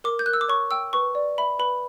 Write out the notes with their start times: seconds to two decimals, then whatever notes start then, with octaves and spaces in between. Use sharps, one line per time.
0.04 A#4 D6
0.19 G6
0.26 A#4 F#6
0.33 E6
0.41 D6
0.48 C#5 C#6
0.71 G5 E6
0.93 B4 C#6
1.15 D5
1.38 E5 B5
1.59 B4 B5